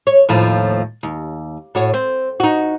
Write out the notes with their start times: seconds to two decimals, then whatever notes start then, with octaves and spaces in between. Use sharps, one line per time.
0.07 C#5
0.29 D#2 A2 F3
1.03 D#2
1.75 A2 F#4 C#5
1.94 C4
2.40 D#4 F#4